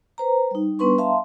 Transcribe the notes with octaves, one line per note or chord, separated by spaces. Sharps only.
B4 C5 A#5
G3 D#4
G3 B3 D4 B4 C6 C#6
E5 F5 A5 A#5 C6